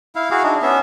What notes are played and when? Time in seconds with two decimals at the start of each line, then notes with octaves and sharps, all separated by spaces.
0.15 E4 F5
0.31 E4 F#4 G#4 F5
0.43 D4 D#4
0.62 B3 C#4 E5